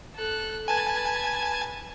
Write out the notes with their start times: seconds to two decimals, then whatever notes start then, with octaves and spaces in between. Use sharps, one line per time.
0.16 A4 F#6
0.68 B4 G#5 A5 G#6